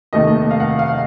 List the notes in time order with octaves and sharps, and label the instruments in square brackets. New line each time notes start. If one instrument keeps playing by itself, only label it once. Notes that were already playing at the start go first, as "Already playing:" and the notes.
[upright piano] F1 D#2 D#3 A3 D#5
F5
F#5
F5